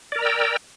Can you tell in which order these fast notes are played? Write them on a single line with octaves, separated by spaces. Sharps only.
D5 A#4 A#5 E6 G5